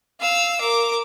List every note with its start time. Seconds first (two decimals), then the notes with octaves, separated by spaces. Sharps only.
0.21 F5 E6
0.61 A#4 D6